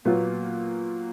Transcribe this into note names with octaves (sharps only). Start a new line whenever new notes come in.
A#2 F#3 A#3 B3 F4